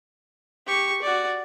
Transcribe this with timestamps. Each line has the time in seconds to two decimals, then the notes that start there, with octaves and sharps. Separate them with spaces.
0.66 G4 C#6
1.02 F#4 D5